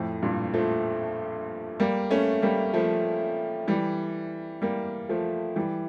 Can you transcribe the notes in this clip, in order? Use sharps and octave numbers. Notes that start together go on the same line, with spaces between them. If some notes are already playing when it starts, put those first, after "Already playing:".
Already playing: F2 A2
G2 A#2
F3 A3
G3 A#3
A3 C#4
G3 A#3
F3 A3
E3 G3
G3 A#3
F3 A3
E3 G3